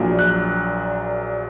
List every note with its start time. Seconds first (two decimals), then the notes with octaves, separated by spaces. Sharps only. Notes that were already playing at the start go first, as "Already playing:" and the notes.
Already playing: A#1 A#2 F#3
0.19 F#6